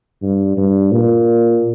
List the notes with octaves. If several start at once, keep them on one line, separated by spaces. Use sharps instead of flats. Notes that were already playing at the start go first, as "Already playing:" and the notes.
G2
G2
A#2